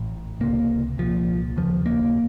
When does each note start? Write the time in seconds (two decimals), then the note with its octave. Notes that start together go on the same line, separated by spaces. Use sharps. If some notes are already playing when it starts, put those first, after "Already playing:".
Already playing: A1 A2
0.40 C#2 C3 A#3
0.98 C2 A#2 F3
1.56 F1 D#2 C#3 F3
1.86 A#3